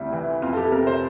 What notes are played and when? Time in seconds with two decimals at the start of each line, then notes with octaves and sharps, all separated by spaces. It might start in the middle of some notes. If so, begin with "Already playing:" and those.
Already playing: D2 C3 G3 E4
0.13 E3
0.42 F2 F4
0.53 A4
0.57 G4
0.65 A4
0.72 C3 A#4
0.87 C5